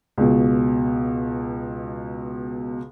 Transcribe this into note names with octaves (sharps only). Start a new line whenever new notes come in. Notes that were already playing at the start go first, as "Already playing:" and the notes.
C#2 B2